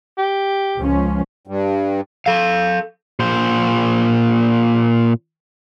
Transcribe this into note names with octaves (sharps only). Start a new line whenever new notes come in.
G4
C#2 F3 C#4
G2
A4 F5
A#2 C5